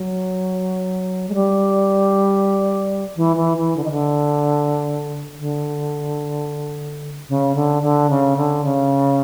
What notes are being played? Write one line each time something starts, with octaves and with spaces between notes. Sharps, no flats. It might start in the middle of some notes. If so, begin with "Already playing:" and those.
Already playing: F#3
G#3
G3
E3
E3
E3
D3
D#3
D3
D3
C#3
D3
D3
C#3
D3
C#3